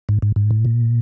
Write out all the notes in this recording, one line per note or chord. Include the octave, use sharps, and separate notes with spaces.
G#2
G#2
G#2
A2
A#2